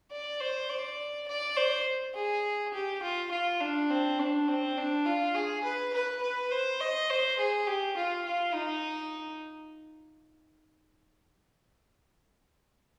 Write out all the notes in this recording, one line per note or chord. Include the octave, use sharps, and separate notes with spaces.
D5
C5
D5
D5
C5
G#4
G4
F4
F4
D4
C4
D4
C4
D4
F4
G#4
B4
B4
B4
C5
D#5
C5
G#4
G4
F4
F4
D#4